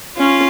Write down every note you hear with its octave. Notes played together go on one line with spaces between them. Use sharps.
C#4 F4